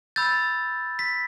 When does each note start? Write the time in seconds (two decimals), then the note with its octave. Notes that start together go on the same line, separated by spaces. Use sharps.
0.16 B5 E6 G6 A6
0.99 B6